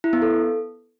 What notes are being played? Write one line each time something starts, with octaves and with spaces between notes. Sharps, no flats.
E4
B3
A4